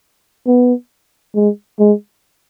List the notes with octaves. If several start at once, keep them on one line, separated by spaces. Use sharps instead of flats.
B3
G#3
G#3